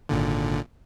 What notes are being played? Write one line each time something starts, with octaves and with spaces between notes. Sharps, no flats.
G#1 A#2 D3